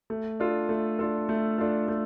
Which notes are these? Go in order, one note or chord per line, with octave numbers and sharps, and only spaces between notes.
A3
D4 F4 A4
A3
D4 F4 A4
A3
D4 F4 A4
A3